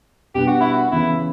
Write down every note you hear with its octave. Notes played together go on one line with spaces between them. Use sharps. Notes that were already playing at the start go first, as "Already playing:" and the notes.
B2 G3 B3 D4 G4
F#4
E4
F#4
C#3 E3 B3 E4